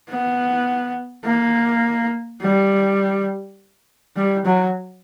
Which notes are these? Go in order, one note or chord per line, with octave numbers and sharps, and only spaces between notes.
B3
A#3
G3
G3
F#3